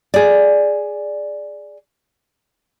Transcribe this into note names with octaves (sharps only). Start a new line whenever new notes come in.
G#4 D5